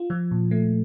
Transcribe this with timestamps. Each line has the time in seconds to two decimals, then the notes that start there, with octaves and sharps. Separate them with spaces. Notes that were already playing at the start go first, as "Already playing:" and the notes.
Already playing: F4
0.10 F3
0.31 A#2
0.51 A3